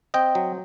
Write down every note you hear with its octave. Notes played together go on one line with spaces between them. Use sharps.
C4 D#5 G5
F#3